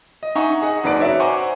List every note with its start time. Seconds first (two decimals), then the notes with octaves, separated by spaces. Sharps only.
0.23 D#5
0.35 D#4 E5 F#5 G#5 C#6
0.62 G#4 D#5 F#5
0.84 F#1 D#4 B4 D5 D7
0.99 F#4 C#5 D5 E5
1.20 C5 F#5 G#5 A#5 C#6 D6